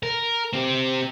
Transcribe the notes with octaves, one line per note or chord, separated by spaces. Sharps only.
A#4
C4 G4